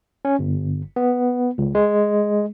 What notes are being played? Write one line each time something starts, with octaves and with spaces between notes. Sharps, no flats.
C#4
G1
B3
C#2
G#3